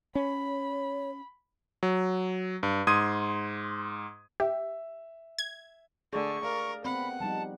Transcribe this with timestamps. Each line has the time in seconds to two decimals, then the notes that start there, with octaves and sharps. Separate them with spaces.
0.15 C#4 C#5 B5
1.83 F#3
2.63 G2
2.87 G#2 C6 D#6 G#6 D#7
4.40 G4 E5
5.38 G#6
6.13 D3 A3 G#4 C#6
6.43 A#4 D5 F5
6.85 B3 C4 F#5 B5
7.20 F3 G3 D#4 A5